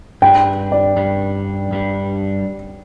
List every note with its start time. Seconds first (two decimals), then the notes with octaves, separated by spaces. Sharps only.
0.22 G2 G3 D4 G5
0.72 D5
0.96 G2 G3 D4
1.71 G2 G3 D4